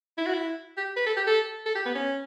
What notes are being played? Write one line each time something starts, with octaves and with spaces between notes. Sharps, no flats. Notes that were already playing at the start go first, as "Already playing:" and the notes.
E4
F#4
E4
G4
B4
A4
G4
A4
A4
G4
B3
C#4